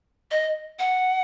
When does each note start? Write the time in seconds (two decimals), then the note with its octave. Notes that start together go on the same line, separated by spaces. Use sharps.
0.31 D#5
0.79 F#5